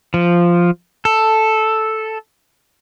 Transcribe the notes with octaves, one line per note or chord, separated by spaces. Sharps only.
F3
A4